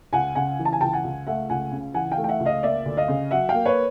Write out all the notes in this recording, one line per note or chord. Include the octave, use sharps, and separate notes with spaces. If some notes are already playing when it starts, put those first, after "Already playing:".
C#2 F#5 G#5
C#3 F#5 G#5
E3
A5
G#5
C#2 G5 A5
F#5 G#5
C#2
A3 E5 F#5
C#2 F#5 G#5
C#3
E3 F#5 G#5
F5 G5
A3
G5
E5 F#5
C#2
D#5 F5
A#3 D5 E5
D2
D#5 F5
C#3
F#3 E5 F#5
F5 G5
A#3
B4 C#5